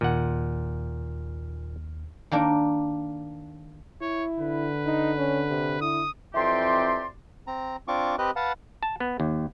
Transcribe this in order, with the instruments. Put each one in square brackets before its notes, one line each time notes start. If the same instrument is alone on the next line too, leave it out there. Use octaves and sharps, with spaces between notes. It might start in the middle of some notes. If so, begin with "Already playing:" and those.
[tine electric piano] D#2 D#3 F6 [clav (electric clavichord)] A#2 F#5
[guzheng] D#3 A#3 D4
[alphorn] E4 [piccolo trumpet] C#5
[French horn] D3 [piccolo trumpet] B4
[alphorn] D#4
C#4
C3
[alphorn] E4 [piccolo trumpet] D#6
[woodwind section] F2 E3 C4 G4 D5 C6
[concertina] C4 A#5
C4 D4 F4 C#6 D6
C4 G4 B4 D#5 F#6
B4 F5 F#5 A5
[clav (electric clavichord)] A5
B3
D#2